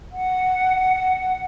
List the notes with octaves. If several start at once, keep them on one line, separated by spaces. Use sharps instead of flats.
F#5